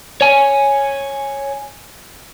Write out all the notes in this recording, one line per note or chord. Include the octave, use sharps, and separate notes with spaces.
C#5 G#5